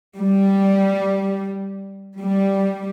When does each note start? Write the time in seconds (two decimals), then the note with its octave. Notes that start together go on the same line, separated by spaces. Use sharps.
0.17 G3
2.19 G3